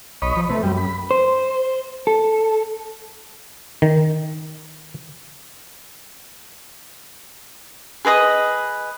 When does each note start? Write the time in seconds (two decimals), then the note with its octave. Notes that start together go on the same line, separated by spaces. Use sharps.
0.22 B1 C#5 D#5 B5
0.36 F3
0.49 C3 A3 B4
0.63 F#2 G3
0.77 B5
1.11 C5
2.07 A4
3.82 D#3
8.05 G#4 B4 D#5 D#6